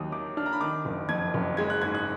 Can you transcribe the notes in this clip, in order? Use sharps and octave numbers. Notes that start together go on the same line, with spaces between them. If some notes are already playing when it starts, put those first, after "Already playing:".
Already playing: D#2 F#3 D#6
D#3 D6
D4 F6
A#5
B5
D#3 D6
F#1
F2 G#6
F#1
G#3 G#6
F#6
G#2 G#6
F#6